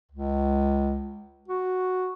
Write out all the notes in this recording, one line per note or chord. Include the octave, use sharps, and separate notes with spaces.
C#2
F#4